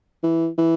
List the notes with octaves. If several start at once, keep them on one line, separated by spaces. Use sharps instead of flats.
E3
E3